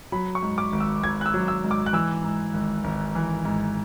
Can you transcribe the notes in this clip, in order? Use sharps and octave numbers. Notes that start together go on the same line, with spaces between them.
F#3 B5
C#6
G#2
D6
G#1
E6
G#1 G#6
F#6
E6
F#3
E6
G#2
D6
F#6
E3 E6
G#2
G#1
G#1
E3
G#2